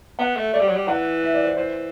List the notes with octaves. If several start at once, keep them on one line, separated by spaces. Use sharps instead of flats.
B3 F#5
A3
A3 D5
G3
F#3
G3
E3 F#5
E5
D5
C5
E3 C5